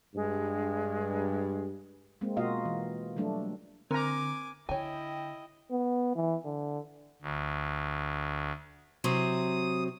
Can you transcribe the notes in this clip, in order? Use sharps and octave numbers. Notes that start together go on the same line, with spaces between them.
G2 G#3
G#3 A#3 C4
B2 A#3 F4 F#4 D#5 F5
E3
F#3 G3 A3 D4
D3 C4 A#4 G#5 A#5 D6
D3 E4 C#5 D#5 G5 G#5
B3
E3
D3
D2
C3 F#3 C4 D#6